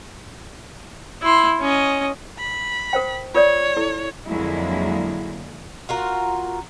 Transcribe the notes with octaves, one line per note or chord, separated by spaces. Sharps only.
E4 C6
C#4 D#5
B5
A#4 C5 G5
F4 A#4 C#5 D5
E4 A4
F2 D3 F#3 G#3 A#3 E4
F4 F#4 A#4